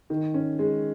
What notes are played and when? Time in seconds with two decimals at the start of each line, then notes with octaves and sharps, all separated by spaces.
0.10 D#3
0.34 C#4
0.59 G#3